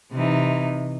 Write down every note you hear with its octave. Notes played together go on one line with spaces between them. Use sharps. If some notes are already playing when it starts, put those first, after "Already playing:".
C3 E3 D#4